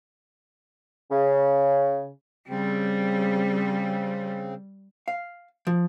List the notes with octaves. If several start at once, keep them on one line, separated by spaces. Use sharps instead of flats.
C#3
C#3 G3 C4
F5
F3